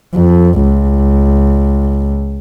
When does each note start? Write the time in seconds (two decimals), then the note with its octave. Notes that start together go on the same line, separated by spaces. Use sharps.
0.15 F2
0.63 C#2